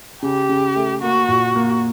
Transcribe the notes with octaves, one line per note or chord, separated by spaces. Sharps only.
C#3 G4
C#3
A3
A#3 F#4
A#2
A#3